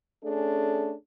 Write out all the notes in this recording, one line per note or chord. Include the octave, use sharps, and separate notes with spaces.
A3 C#4 D4 G#4 A4